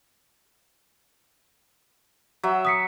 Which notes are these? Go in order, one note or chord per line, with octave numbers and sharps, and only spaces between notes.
F#3 E5
D#6 B6 C#7